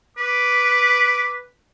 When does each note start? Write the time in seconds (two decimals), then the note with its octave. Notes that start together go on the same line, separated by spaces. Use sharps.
0.18 B4 D6